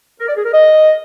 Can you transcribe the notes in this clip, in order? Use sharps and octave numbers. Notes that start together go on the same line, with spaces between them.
A#4
D5
G#4
A#4
D#5